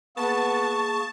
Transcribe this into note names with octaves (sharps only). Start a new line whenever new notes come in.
A#3 B3 G#4 A5 C#6